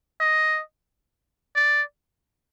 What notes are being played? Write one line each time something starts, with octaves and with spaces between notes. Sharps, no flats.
D#5
D5